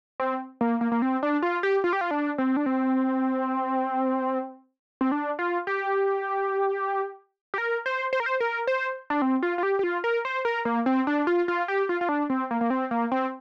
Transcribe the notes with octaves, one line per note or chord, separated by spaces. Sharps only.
C4
A#3
A#3
A#3
C4
D4
F4
G4
F4
G4
F4
D4
C4
D4
C4
C4
D4
F4
G4
G4
A#4
C5
C5
A#4
C5
A#4
C5
D4
C4
F4
F4
G4
G4
F4
A#4
C5
A#4
A#3
C4
D4
F4
F4
G4
F4
F4
D4
C4
A#3
A#3
C4
A#3
C4